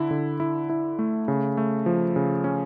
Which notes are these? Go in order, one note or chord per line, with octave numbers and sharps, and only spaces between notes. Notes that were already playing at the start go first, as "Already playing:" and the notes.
Already playing: D3 E4
D3
E4
E4
A3
C#3
A3
F3
C#3
C#4